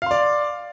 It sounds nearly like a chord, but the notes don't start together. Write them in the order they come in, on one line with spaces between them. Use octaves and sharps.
F5 C6 D5